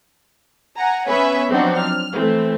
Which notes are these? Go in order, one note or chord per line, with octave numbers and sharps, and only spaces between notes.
F#5 G#5 A#5
B3 C#4 B4 C#5 E5 G#5
F3 F#3 C4 D4 D#4 F#4
F6
E3 A3 C4